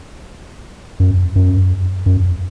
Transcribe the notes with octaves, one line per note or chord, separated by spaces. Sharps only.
F#2
F#2
F#2